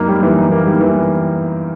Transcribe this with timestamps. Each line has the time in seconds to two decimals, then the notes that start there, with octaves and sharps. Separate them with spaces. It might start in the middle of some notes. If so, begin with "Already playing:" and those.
Already playing: F#2 A#3 D#4
0.08 G3
0.23 E3
0.38 D#4
0.52 A#3
0.67 G3
0.81 E3